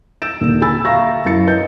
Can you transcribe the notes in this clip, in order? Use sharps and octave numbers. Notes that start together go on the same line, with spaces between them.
E6 G6 A6 D7 E7
D#2 A#2 D3
G#5 B5 E6 A6
E5 F5 A#5 C#6 A#6
F#2 E4 A6 C#7
B4 D#5 G6 A6